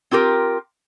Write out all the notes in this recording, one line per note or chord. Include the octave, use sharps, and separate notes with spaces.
C4 F4 G4 A#4